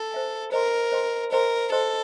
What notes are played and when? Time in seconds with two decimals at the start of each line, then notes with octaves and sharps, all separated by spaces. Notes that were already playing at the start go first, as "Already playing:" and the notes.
Already playing: A4
0.12 C5 E5 G#5
0.52 A#4 C5 D#5 G5 C6
0.92 C5 D#5 G5 C6
1.32 A#4 C5 D#5 G5 C6
1.72 A4 C5 D#5 G5 C6